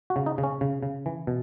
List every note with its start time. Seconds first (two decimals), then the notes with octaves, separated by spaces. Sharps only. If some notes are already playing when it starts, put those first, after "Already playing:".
0.10 F#4
0.16 C#3
0.26 D#4
0.38 C#3
0.43 C#4
0.61 C#3
0.83 C#3
1.06 E3
1.27 B2